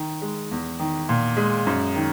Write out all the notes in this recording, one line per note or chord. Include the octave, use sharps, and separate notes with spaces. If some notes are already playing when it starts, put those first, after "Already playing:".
Already playing: D#3
G#3
E2
D#3
A#2
G#3
F#2
D#3